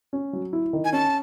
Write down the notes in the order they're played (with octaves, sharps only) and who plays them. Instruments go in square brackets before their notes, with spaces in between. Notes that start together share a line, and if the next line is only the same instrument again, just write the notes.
[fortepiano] C#4
F#3
E4
D#3
[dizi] G#5
[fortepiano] C#4 [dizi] A5